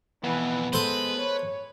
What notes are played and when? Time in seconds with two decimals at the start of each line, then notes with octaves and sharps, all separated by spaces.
0.24 F2 B2 E3 B3
0.73 G#3 A4 B4 C5
1.19 C#5